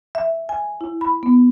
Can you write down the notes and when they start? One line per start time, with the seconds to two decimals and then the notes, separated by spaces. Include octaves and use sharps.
0.15 E5
0.49 G#5
0.81 E4
1.01 B5
1.23 B3